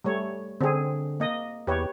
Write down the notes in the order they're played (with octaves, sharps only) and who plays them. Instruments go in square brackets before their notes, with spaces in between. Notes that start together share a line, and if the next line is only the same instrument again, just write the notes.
[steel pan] G3 A3 C#5
[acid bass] D3 [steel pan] C4 G#4
[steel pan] A#3 D#5
[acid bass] E2 [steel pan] G4 B4 C#5